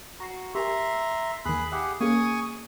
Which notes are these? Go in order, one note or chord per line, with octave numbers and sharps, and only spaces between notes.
F#4 A#5 C7
G4 A#4 E5 G#5 A#5 C6
D#2 D#3 G#4 B5 F#6
G4 G#4 E5 F#5 B5
A#3 C#4 G#4 G#5 C#6 D#6